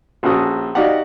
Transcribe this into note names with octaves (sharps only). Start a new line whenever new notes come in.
A#1 C#4 F#4 A4 D#6
D#4 F#4 G4 D5 F5 F#5